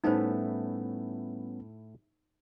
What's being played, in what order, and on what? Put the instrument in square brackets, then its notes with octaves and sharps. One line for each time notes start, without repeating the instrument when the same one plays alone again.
[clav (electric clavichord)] A2 A3 E4 [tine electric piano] G3 B3 C#4 [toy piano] D#4 C5